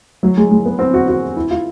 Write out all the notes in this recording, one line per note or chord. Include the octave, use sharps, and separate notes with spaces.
F#3
G#3
G#3
B3
C4
F#4
F#4
E4
F4